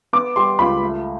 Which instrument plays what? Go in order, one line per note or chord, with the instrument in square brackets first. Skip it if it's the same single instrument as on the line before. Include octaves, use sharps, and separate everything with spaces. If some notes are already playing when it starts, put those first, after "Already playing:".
[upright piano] B3 D6
G3 C6
C#2 B5
A3